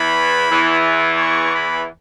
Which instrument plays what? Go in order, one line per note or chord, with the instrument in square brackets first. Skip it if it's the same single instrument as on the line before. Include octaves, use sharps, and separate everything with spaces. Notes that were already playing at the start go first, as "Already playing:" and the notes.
Already playing: [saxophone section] E2 E3 [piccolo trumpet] B5
[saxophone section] E2 E3
[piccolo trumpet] C#6
B5